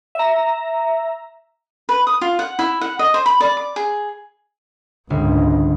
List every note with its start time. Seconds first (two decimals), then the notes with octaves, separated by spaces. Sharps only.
0.15 E5 A#5
1.89 B4
2.07 D#6
2.21 F4
2.39 F#5
2.59 E4
2.81 F#5
2.99 D#5
3.14 C5
3.26 B5
3.40 D5
3.57 D6
3.76 G#4
5.10 G1 C#2 G#2